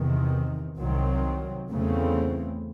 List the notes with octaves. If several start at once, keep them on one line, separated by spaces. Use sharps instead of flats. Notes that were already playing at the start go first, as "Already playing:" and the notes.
Already playing: E2 C3 D#3
C2 C3 D#3 F#3 C4
E2 C#3 E3 A3 C4